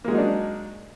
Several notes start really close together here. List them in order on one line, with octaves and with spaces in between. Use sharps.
A#3 G#3 F#3 D#4 D4